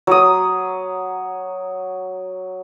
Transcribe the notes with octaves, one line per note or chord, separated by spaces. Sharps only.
F#3 D#6